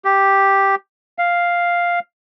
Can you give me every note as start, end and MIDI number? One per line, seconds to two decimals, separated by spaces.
0.05 0.75 67
1.18 1.99 77